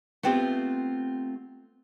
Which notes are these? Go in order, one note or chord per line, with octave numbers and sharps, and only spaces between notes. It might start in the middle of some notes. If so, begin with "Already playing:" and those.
A3 B3 C4 F4 G4